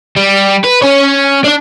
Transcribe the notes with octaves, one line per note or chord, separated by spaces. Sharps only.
G3
B4
C#4 C#5
D4 D5